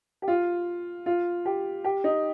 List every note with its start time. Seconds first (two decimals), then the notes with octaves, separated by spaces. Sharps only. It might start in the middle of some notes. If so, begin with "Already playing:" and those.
0.22 G4
0.28 F4
1.06 F4
1.45 G4
1.84 G4
2.04 D#4